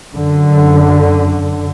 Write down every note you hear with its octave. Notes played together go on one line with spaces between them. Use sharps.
F#2 D3